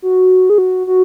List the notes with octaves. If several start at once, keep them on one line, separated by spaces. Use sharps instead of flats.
F#4
G#4
F#4
F#4